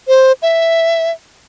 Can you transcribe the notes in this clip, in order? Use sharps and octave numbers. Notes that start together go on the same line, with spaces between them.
C5
E5